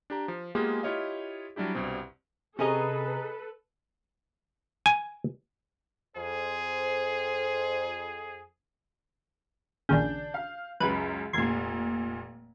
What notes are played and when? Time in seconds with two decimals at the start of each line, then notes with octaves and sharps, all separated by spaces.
0.10 D4 G4 A#5
0.28 F3
0.55 G#3 A#3 B3 F4 G4 G#4
0.83 E4 F4 G4 C#5 D#5 F5
1.56 F#3 G3 D4 E4 G4
1.75 C2 G2 B2 C4
2.59 C3 C#4 G#4 A4 B4 D#5 A#5
4.86 G#5
6.16 F2 G#4 C5
9.89 A#1 D#2 C#3 D4 G6
10.34 F5
10.80 C#2 F#2 B4
11.33 F1 A#2 C6 G#6